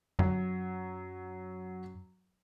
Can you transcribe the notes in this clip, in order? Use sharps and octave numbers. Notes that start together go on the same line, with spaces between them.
F#2 F#3